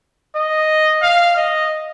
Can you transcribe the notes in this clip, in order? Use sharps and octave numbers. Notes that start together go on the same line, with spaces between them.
D#5
F5
D#5